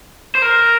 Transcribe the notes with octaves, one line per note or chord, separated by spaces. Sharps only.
C5
A#4